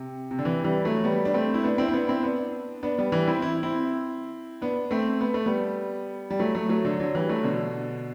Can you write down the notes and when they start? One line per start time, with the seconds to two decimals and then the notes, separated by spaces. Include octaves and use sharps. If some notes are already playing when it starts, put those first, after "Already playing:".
Already playing: C3
0.31 C3
0.39 D3
0.45 C3 E3
0.64 E3 G3
0.85 F#3 A3
1.04 G3 B3
1.25 D4
1.34 A3 C4
1.54 E4
1.64 B3 D4
1.78 C4 E4
1.88 C4
1.94 B3 D4
2.08 C4 E4
2.23 B3 D4
2.83 B3 D4
2.98 G3 B3
3.12 E3 G3
3.27 C4 E4
3.42 E4
3.63 C4 E4
4.62 B3 D4
4.91 A3 C4
5.21 B3
5.34 A3
5.46 G3 B3
6.31 G3
6.40 F#3 A3
6.55 F#3 A3
6.69 F#3 A3
6.85 D3 F#3
7.00 D3 F#3
7.15 E3 G3
7.29 F#3 A3
7.44 B2 D3